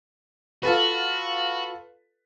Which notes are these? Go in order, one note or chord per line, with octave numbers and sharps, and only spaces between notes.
F4 F#4 A4 B4